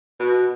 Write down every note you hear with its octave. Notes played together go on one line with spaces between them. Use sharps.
B2